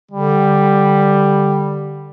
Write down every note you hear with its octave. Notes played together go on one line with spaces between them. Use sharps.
D3 G3